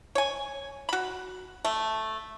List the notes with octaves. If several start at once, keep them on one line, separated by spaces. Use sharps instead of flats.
C#5 G#5
F#4 B5
A3